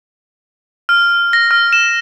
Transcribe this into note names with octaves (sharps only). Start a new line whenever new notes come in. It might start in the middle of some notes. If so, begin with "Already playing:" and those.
F6
A#6
F6
E7